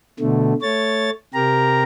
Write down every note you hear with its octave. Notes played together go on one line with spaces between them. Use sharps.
B2 D3 A3
A3 C#5 A6
C3 G4 A#4 A#5